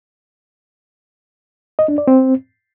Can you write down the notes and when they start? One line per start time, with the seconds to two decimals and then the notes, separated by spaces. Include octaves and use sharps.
1.79 D#5
1.88 D4
1.98 D5
2.07 C4